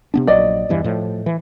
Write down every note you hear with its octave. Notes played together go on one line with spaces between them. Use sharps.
C3 B3 D4
A#1 F#3 D5 D#5
E2 G2 E3
A2 F3
E3